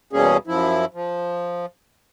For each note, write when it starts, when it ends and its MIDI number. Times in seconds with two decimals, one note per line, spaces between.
0.13 0.37 40
0.13 0.37 47
0.13 0.37 55
0.13 0.37 58
0.13 0.37 61
0.13 0.37 68
0.47 0.85 42
0.47 0.85 53
0.47 0.85 64
0.94 1.66 53